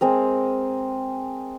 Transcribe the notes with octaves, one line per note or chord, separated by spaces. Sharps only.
G#3 C4 A#4